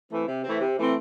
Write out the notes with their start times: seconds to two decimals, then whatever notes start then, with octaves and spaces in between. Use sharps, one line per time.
0.10 E3 A3 C4
0.27 C3
0.44 E3 A3 C4
0.60 C3
0.77 E3 A3 C4